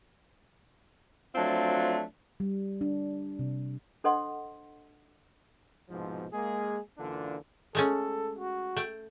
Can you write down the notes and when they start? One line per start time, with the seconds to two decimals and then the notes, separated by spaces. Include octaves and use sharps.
1.35 F3 F#3 A3 C4 D4 F4
2.40 G3
2.81 D4
3.39 C3
4.04 D4 A4 C5 D#5 F#5 C6
5.89 C2 G#2 B2 F3
6.33 G#3 A#3 G#4
6.98 F#2 D3 E3 A#3 D4 F4
7.75 G#3 A3 C#4 A4
8.39 F#4
8.76 A3 G5